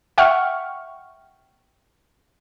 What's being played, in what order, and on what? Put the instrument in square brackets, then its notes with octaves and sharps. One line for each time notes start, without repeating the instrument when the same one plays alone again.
[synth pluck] E5 F#5 G5 C#6 F6